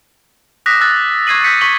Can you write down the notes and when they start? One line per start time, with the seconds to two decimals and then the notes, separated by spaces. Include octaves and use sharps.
0.66 D6 D#6 F#6 A#6 B6
0.81 E6 F#6 A6 A#6
1.27 C#6 G#6 A6 C7 D#7 F#7
1.44 E6 F#6 G6 A#6 B6 C#7
1.61 C#6 B6 C#7 F#7 G7